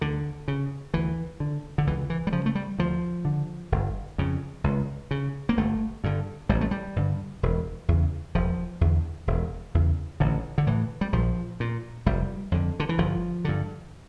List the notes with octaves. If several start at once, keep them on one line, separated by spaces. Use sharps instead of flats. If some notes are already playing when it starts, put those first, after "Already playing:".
D2 D3
C#3
D2 E3
D3
D3
C#2 E3
E3
G3
C#3 F3
A3
G3
D2 F3
D3
G1
F2 C#3
C#2
C#3
A#3
G1 A3
G2 D3
A1 G3
A3
G3
G2 D3
E1
E2 C#3
E1 F3
E2 D3
E1
E2 C#3
A1 D3
D3
A2 E3
G3
A#1 F3
A#2
F1 G3
F2 D3
D3
E3
G1 F3
G2 D3